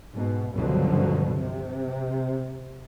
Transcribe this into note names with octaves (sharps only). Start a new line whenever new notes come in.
G#2 B2
C#2 G2 B2 D3 F3 F#3
C3